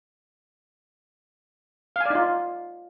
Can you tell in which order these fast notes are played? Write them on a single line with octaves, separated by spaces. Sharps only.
F5 G#5 D5 D#4 F4